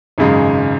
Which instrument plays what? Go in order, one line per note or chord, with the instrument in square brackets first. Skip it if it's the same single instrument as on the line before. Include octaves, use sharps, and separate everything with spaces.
[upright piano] G#1 F#2 C#3 G#3